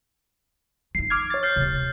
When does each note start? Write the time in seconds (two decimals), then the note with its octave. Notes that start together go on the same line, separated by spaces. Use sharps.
0.95 F3 D#4 C7
1.10 D6 F6 G#6
1.30 C#5 A6
1.43 F6 G6 C7
1.56 D1 C3